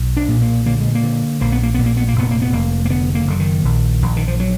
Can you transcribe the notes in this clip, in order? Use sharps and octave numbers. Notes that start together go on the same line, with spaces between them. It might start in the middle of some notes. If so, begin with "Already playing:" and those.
Already playing: B1
D4
A#2
A#3
D3 A#3
G#3
A#3
D3
A#1 A#3
B3
A#3
A#2 B3
A#3
B3
A#3
F1 B3
A#3
B3
F1 A#3
A#3
D3 B3
A#3
F#1 D3
D#3
A#1
A#1
D#3
F3
F#3